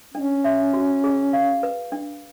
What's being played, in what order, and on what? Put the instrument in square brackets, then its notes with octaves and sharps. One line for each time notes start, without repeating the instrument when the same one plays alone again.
[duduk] C#4 [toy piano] D4
[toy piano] E5
F#4
G#4
F5
B4
D4